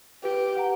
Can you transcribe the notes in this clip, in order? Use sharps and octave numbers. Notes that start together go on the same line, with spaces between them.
G4 B4
F#5 A#5